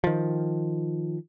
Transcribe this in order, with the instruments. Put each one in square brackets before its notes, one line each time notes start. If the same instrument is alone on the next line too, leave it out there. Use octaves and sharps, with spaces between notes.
[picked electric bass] D#3 F3